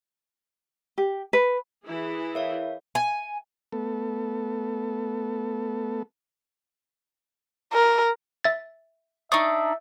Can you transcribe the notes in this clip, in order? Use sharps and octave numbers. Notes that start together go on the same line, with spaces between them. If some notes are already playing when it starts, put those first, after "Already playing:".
G4
B4
E3 E4 G#4
A#4 C#5 E5 F5
G#5
A3 B3 A4
A#4
E5 A6
D4 D#4 E5 C#6 D#6